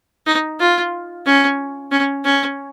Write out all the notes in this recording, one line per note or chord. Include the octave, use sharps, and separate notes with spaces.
D#4
F4
C#4
C#4
C#4